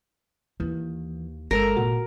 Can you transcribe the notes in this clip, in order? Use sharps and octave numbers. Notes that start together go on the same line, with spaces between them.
D#2 E3
G1 G#3 A4 A#4 E6
A#2 F#4